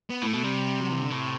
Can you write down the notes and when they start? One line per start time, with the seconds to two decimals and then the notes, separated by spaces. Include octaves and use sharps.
0.10 B3
0.23 A2 A3
0.34 B2
0.44 C3 G3
0.81 F#3
0.91 E3
1.00 D3
1.11 A2 C3